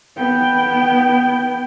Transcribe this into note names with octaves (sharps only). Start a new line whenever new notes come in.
B3 G5